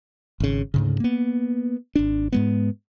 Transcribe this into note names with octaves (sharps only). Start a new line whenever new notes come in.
G#1 C#3
D2 G#2 C#3
A#3 B3
G#1 D4
G#2 G#3 B3